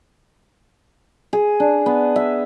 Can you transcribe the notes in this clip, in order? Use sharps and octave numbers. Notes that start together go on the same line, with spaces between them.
G#4
D4
B3
E5